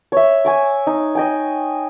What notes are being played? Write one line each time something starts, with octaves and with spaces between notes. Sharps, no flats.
C#5 E5
G#5 C#6 D6
D#4
D#5 G5 G#5